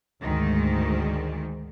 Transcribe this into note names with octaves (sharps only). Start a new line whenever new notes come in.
D2 G#2 D#3